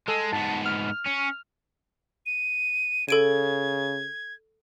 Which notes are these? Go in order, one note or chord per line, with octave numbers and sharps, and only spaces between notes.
G#3 A4
G#2 B3 A5
F6
C#4
D#7
C#3 A4 G#6 D7 D#7